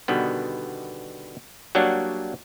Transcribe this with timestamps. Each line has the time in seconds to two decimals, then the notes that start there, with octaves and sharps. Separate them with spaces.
0.08 B2 D3 D#3 G3 B3
1.75 F#3 G3 A#3 D4 C#5 F#5